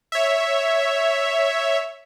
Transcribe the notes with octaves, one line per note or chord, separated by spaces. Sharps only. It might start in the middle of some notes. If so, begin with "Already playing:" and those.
C#5 E5